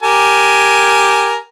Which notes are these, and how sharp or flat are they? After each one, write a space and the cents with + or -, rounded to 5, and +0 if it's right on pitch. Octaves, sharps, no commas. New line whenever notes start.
G4 +0 A#4 +0 G#5 +10